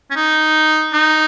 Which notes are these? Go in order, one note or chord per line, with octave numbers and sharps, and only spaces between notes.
C#4
D#4
D#4